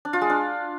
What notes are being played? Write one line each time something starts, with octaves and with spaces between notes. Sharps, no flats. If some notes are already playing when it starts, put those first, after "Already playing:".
D4
F4
G#3
D4